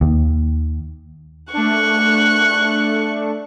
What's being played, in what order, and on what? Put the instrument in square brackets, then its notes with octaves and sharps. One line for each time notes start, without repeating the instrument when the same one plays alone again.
[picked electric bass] D#2
[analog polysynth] A3 D4 [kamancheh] C#6 F#6